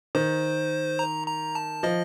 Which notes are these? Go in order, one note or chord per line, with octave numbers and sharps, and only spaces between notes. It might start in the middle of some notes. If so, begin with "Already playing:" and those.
D#3 C5
A#5
A#5
A5
F3 D#5